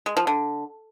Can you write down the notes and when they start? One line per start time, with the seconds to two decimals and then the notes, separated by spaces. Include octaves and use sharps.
0.06 G#3
0.17 F3
0.27 D3